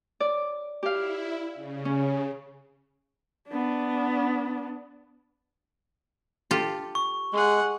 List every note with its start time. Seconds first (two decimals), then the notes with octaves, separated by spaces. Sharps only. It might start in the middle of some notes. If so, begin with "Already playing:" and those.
0.20 D5
0.83 E4 G4 F5
1.54 C#3
1.85 C#4
3.48 B3 D4
6.51 F4 G4 A4
6.95 C#6
7.33 G#3 G#4 F#5